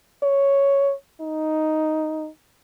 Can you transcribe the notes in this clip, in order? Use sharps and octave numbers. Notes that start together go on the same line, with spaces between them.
C#5
D#4